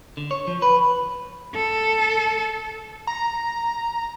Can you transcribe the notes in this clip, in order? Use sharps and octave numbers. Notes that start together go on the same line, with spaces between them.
D3
C#5
F3
B4
A4
A#5